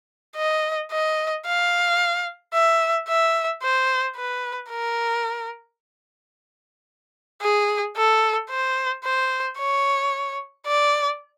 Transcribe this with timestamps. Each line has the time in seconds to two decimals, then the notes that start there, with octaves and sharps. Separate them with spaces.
0.37 D#5
0.92 D#5
1.46 F5
2.54 E5
3.09 E5
3.63 C5
4.16 B4
4.70 A#4
7.41 G#4
7.97 A4
8.50 C5
9.04 C5
9.59 C#5
10.67 D5